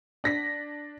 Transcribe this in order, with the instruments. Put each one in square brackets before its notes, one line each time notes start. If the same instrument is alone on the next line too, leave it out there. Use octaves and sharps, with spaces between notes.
[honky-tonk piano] D4 A#6 B6